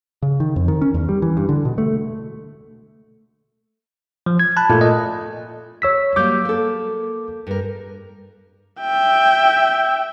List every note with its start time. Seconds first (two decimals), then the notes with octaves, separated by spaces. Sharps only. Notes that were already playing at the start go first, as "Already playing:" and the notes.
0.23 C#3
0.40 D#3
0.56 F2
0.68 D#3
0.81 C#4
0.94 E2
1.09 G3
1.22 E3
1.37 G2
1.49 D3
1.65 B2
1.78 A3
4.26 F3
4.40 G#6
4.57 A5 B5 F#6
4.69 A#2 A3
4.81 D#5
5.82 C#5 E6 B6
6.16 F#3 G3 A#3 D6 G6
6.45 A#3 A4
7.47 G2 A#4
8.80 E5 G5